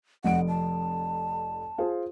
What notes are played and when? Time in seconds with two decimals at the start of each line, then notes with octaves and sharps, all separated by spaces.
0.24 F1 F2 F#5 D7
0.49 A5
1.78 F4 G#4 C5